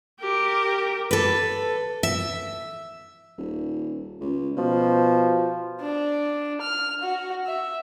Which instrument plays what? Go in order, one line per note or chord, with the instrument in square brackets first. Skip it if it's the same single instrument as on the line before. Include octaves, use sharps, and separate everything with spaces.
[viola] G4 A#4
[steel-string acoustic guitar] A4 B4
E5
[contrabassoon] D#1
C#2
[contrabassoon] B2 [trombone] F3
[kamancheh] D4
F6
F#4
E5